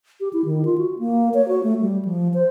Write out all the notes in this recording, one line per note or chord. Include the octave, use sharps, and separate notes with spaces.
G4
E4
D#3
F4
F#4
A#3
C#5
F#4
A3
G3
F3
C5